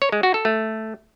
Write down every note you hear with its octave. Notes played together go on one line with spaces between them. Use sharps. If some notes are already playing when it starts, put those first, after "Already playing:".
C#5
G#3
F#4
A4
A3